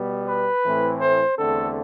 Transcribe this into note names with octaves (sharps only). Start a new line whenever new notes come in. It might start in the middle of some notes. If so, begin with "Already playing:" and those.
Already playing: B2 G3 B3
B4
A2 E3 A3 C4
C5
E2 D3 A3 C4 A4